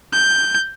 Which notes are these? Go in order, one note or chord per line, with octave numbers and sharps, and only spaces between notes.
G6